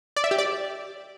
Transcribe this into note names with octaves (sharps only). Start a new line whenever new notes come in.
D5
E5
G4
D5